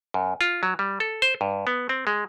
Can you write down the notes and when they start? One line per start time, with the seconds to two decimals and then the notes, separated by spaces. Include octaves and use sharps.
0.14 F#2
0.41 F4
0.63 F#3
0.79 G3
1.00 A4
1.22 C5
1.41 G2
1.67 B3
1.89 C4
2.07 G#3